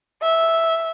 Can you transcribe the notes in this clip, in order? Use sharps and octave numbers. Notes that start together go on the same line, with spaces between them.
E5